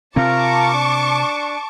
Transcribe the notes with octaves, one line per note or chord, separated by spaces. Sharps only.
C3 C4 F4 A#4 A5 A#5 C#6 D6
D4